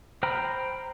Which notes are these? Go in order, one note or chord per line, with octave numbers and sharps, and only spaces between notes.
C5 G5 A#5 B5 F6